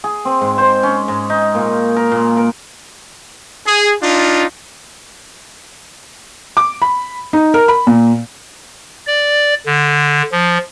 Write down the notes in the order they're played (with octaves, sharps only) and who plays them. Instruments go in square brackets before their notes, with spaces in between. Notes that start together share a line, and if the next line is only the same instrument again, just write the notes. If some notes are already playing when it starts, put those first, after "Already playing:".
[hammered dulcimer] G#4
C4
G#2
C5
C#4
G#2
D#4
A#2
A#4
A#2
A#4
[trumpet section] G#4
D4 D#4 F4
[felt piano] D6
B5
D#4
A#4
B5
A#2
[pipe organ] D5
D3
F3